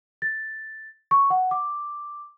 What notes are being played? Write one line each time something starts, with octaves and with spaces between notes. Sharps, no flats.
A6
C#6
F#5
D6